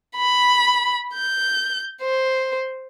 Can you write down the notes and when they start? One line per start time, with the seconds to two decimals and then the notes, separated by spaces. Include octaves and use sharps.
0.17 B5
1.14 G6
2.02 C5